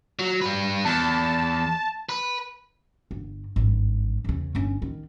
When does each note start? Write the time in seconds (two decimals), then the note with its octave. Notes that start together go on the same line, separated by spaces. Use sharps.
0.19 F#3
0.42 G3 B4
0.85 E2 A5
2.09 B4
3.11 G1
3.56 G#1 G2
4.24 E2 C#3
4.55 G1 C#4
4.82 D#3